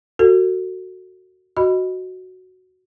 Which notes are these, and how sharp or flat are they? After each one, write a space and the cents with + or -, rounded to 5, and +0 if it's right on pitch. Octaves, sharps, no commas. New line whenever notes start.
F#4 +0 A4 +35
F#4 +0 D#5 +0 B5 +0